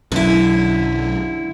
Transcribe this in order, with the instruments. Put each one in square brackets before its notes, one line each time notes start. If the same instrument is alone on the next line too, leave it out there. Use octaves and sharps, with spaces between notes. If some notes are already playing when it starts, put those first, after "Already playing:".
[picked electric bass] B1 F#2 [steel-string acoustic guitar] D3 E4